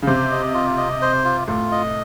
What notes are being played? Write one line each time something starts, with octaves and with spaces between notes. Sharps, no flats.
C#3
C3 C5
D#5
F4
D#5
C5
F4
A2 F4
D#5